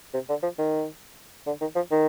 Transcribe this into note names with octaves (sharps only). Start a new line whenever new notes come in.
C3
D3
F3
D#3
D3
D#3
F3
D#3